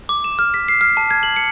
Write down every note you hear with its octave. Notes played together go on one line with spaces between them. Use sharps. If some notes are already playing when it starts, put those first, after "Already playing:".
D6
E7
F6
B6
C7
F6
A5
G#6
F#7
C#7